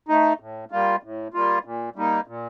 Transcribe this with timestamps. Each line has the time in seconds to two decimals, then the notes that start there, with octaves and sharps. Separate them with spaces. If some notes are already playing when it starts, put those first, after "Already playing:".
0.09 A3 D#4
0.40 A2
0.71 G3 A#3 F4
1.03 A2
1.34 G3 A#3 F4
1.65 A#2
1.96 G3 A#3 D#4
2.27 A#2